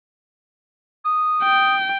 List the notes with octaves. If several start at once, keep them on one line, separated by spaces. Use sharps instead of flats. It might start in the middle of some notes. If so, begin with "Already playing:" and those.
D#6
G5